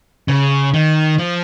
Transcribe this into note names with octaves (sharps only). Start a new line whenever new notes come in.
C#3
D#3
F3